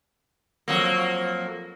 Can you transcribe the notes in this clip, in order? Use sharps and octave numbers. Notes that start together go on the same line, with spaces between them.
F2 F#3 A#3